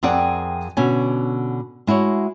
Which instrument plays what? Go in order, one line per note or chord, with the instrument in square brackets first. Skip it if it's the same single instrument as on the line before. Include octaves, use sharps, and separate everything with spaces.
[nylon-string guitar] F2 C4 G#4 A#4 D5 F#5
B2 D3 C#4 G#5
G#3 E4 F#4 C#5